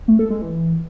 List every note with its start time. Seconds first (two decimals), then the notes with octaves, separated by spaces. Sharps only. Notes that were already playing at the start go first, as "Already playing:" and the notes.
0.08 A3
0.19 A4
0.30 G#3
0.42 E3